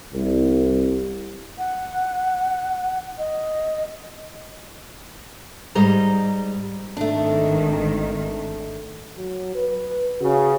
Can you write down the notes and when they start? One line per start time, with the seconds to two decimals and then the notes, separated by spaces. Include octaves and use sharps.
0.14 C2
1.58 F#5
3.18 D#5
5.75 G#2 G3 D#5 A#5
6.97 G#1 D#3 A3 D4
9.17 F#3
9.55 B4
10.21 C#3 F#4